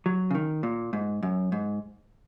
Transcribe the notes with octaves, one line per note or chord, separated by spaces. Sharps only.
F#3
C#3
D#3
A#2
G#2
F#2
G#2